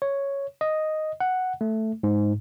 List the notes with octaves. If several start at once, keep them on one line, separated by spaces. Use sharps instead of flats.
C#5
D#5
F#5
A3
G#2